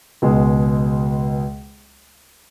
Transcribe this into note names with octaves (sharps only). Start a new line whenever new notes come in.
C#2 B2 G#3